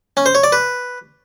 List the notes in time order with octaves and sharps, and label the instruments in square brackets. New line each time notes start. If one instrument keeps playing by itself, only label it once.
[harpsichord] C#4
C5
C#5
D5
B4